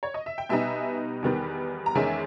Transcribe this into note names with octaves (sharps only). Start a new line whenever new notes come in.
C#5
D#5
E5
G5
B2 G3 B3 D#4 E5 G#5
E2 D#3 G3 B3
A#5
E2 D#3 G#3 C#4 E5 G#5